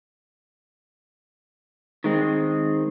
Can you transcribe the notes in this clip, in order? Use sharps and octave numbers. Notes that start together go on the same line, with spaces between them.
D#3 G#3 C4